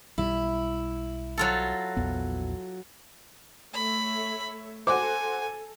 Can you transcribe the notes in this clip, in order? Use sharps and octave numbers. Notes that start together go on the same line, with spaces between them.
B1 G3 E4
F#3 F4 A4
A#1 E2 B3
A3 C#5 E5 B5
F#4 A4 C5 G#5 D6